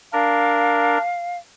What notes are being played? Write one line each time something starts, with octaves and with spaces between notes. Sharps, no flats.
D4 A#4 F5